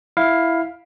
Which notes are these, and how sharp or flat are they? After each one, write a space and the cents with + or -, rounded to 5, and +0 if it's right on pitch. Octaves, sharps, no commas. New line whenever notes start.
E4 +5 F5 +10